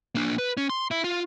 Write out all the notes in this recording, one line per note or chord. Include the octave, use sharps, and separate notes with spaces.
A#3 D4
B4
C#4
C6
E4
F4